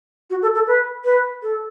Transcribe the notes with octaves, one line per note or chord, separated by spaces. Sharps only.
F#4
A4
A4
B4
B4
A4